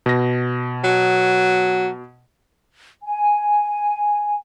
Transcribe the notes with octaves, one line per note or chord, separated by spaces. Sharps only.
B2 A#6
F#3
G#5